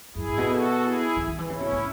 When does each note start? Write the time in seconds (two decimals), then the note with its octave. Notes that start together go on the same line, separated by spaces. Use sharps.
0.15 F#2 E4 G#4
0.27 A2
0.38 B2
0.49 F#4 A4
0.82 E4 G#4
1.16 D#3
1.27 D#3
1.38 E3
1.49 C#3 C#4 E4
1.60 B2
1.72 A2